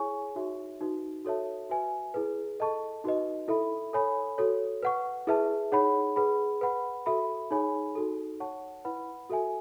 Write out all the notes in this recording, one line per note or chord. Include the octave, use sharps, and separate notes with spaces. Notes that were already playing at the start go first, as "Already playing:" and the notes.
Already playing: E4 G#4 C#5 G#5 C#6
D#4 F#4 C#5 E5
D#4 F#4 B4
F#4 A4 C#5 E5 A5
F#4 B4 E5 G#5
E4 G#4 B4
A4 D#5 A5 C#6
D#4 F#4 B4 D#5
E4 A4 E5 B5
A4 C#5 G#5 B5
F#4 A4 C#5
B4 F#5 C#6
E4 G#4 B4 E5 A5
D#4 G#4 C#5 F#5 B5
G#4 B4 F#5 B5
B4 F#5 B5
F#4 A4 E5 B5
D#4 G#4 C#5 G#5 B5
D#4 F#4 A4
C#5 F#5 A5 C#6
E4 B4 F#5 B5
F#4 A4 E5 G#5